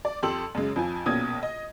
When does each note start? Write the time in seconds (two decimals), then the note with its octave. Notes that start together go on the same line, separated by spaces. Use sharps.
0.05 D5
0.23 F2 G4 A4 C6 E6 F#7
0.55 F#2 C#3 G#3
0.76 F2 F3 G#5
1.06 A#1 B2 A#3 C#4 D#6 G#6
1.43 D#5